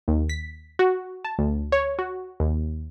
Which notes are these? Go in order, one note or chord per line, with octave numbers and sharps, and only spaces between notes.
D#2
B6
F#4
A5
D2
C#5
F#4
D#2